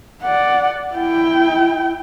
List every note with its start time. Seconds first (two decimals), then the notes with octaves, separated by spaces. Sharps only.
0.22 D5 F#5
0.94 E4 G5